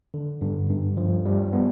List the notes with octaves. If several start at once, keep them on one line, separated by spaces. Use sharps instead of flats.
D3
G2
G2
F3
G3
B3